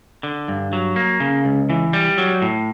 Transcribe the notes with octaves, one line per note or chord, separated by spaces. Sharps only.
D3
G2
F#3
A#3
C#3
C#2
E3
G3
F#3
A2